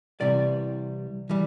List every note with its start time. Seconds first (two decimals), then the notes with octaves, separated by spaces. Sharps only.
0.20 C2 C3 E3 G3 D5
1.30 E3 G3